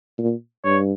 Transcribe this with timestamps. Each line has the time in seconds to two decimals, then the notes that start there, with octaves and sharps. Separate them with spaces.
0.18 A#2
0.65 G2 C#5